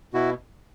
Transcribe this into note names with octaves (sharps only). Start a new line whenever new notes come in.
B2 E4 F#4